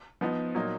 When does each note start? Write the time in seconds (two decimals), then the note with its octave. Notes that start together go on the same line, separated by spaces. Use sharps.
0.21 F3 B3 D#4
0.55 A#2 F#3 A#3 D#4